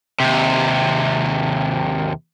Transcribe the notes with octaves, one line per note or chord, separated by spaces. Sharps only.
D#2 C3